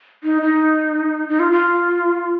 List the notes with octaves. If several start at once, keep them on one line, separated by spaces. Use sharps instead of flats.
D#4
D#4
D#4
F4
F4